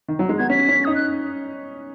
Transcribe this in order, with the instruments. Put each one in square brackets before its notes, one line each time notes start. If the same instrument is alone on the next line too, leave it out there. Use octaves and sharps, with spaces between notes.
[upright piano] D#3
F#3
G#3
[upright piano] B3 [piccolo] G#6
[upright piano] C#4 [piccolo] B6
[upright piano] C#4
[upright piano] D#4 [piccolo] D#6
[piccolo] F#6